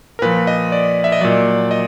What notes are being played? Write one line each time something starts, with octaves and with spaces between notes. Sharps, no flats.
A#4
A#2 F3 B4
D#5
D5
E5
D#5
A#2 F#3 D5
D#5